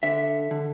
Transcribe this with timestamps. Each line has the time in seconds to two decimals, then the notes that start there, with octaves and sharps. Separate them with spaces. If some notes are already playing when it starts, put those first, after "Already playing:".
0.03 D3 E5
0.51 D3